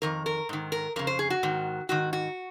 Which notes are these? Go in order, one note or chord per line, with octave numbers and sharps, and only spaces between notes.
F2 D#3 A#4
A#4
G#2 D#3
A#4
F2 C#3 A#4
C5
G#4
F#4
G#2 D#3
G#2 D#3 F#4
F#4